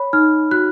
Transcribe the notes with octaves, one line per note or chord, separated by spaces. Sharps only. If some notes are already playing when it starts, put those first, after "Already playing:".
Already playing: C#5 B5
D#4 F6
F#4 F#6